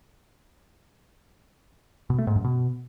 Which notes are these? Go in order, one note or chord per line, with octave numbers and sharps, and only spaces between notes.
B2
A3
G#2
F#2
B2